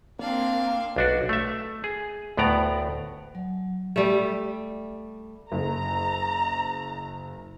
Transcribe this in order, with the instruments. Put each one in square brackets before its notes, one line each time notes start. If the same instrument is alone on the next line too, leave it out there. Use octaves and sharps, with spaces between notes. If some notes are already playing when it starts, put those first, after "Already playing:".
[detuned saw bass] A#3 [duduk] C4 [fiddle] D4 F5
[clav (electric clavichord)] B1 D4 F#4
A3 E5
G#4
D2 A2 B3 D5 A#5
[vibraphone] F#3
[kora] G3 A3
[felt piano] F#1 [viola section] A#5